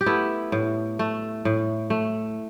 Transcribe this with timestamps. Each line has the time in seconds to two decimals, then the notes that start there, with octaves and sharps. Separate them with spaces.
0.01 G4
0.06 A3 B3 E4
0.52 A2
0.99 A3
1.45 A2
1.90 A3